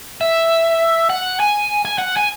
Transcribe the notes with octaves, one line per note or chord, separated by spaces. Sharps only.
E5
F#5
G#5
G#5
F#5
G#5